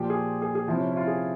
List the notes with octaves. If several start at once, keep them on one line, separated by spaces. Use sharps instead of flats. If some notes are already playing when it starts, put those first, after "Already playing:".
Already playing: A#2 F3 G4
G#4
G#4
G#4
C3 F3 E4
C#4
E4
F4
G#4